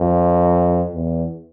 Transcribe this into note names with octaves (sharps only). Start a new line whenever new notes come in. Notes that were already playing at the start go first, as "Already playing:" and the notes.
Already playing: F2
E2